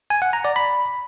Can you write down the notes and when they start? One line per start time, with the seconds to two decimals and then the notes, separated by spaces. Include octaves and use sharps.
0.10 G#5
0.22 F#5
0.33 A#5
0.45 D5
0.56 B5